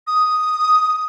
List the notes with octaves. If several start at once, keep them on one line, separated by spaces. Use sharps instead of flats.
D#6